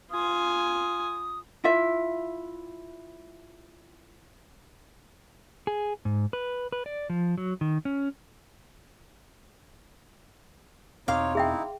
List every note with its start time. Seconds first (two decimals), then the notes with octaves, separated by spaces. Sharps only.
0.11 F4 G#5 D#6
1.64 E4 F4 E5
5.67 G#4
6.05 G#2
6.33 B4
6.72 B4
6.86 D5
7.10 F3
7.38 F#3
7.61 D#3
7.85 C#4
11.08 E2 B2 C4 D#4 C#5 F5 C6 D6
11.35 D#4 E4 G#4 E5 G5